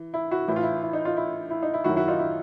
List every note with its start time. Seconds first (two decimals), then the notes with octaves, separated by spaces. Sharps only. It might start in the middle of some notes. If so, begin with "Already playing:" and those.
Already playing: E3
0.14 E4
0.31 E4 F#4
0.48 A2 E3 E4
0.56 F4
0.63 E4
0.83 E4
0.93 D#4
1.05 D#4 F4
1.17 E4
1.50 E4
1.63 D#4
1.74 E4
1.84 F#2 D#3 E4 F#4
1.96 E4 F#4
2.08 D#4 F4
2.19 E4